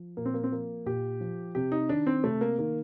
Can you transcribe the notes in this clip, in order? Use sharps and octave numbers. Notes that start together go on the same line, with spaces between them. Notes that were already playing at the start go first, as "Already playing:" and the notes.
Already playing: F3
A#2 A#3
C4
A#3
C4
F3 A#3
A#2 G4
F3
C3 G4
D#4
D#3 D4
C4
C3 A3
A#3
D#3 A#3